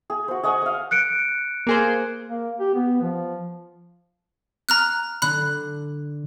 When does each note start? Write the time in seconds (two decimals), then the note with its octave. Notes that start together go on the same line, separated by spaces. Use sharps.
0.10 G#4
0.28 F#4 C5
0.43 G#4 D#5 F#5 C#6
0.62 D#5 F5
0.91 F#6 C#7 D7
1.67 A#3 G#4 C5
2.28 A#3
2.60 G4
2.74 B3
3.01 F3
4.69 A#5 F6 F#6
5.22 D3 D4 B5 F#6